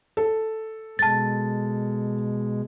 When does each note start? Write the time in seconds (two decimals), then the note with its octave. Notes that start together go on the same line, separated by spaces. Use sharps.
0.17 A4
0.99 B2 G#3 A5 A6